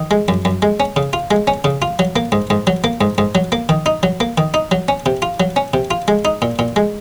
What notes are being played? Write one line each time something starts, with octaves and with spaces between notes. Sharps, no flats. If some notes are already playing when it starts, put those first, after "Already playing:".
Already playing: D#3
G#3
F#2
F#2
G#3
C#4
C#3
F4
G#3
C#4
C#3
F4
F#3
A#3
G#2
G#2
F#3
A#3
G#2
G#2
F#3
A#3
D#3
D#4
F#3
A#3
D#3
D#4
F#3
C#4
C3
F4
F#3
C#4
C3
F4
G#3
D#4
A#2
A#2
G#3